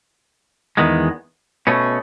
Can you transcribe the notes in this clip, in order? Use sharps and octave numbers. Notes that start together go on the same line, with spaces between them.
E2 D#3 G#3 B3
B2 A3 C#4